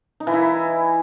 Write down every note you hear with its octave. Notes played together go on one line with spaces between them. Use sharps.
D#4
E3
E4